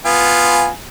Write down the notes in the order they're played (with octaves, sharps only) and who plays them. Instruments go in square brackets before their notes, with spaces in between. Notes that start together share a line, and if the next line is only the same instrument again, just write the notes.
[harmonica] B3 F4 G#5